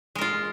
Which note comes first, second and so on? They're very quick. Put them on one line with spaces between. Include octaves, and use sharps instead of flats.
G#3 A#4 F4